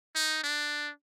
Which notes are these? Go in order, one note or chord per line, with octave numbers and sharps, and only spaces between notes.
D#4
D4